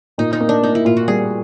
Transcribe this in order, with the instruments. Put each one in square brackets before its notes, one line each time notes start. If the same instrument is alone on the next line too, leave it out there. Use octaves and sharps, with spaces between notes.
[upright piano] A#2 [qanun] D#4
[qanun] D#4
[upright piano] A#3
[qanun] D4
[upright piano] A#3 [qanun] D#4
[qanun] E4
[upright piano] A#2 [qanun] F4
[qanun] F#4
[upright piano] G3 [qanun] G#4